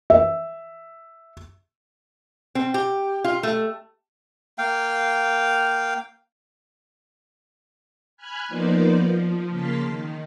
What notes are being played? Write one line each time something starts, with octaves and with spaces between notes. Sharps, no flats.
E5
C4
G4
F4
A3
A#3 F5 G5
G#5 B5 F6 F#6 G#6
F3 A#3 B3 D#4 C5 D5
F3
C#3 A#3 A5 C6 F6 B6
D#3